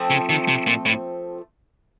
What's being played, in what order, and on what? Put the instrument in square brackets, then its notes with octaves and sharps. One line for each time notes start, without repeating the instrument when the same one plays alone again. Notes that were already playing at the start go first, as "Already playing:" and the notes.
Already playing: [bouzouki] F3 A3 C4
[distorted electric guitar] C#3
D#3
C3
A#2
A2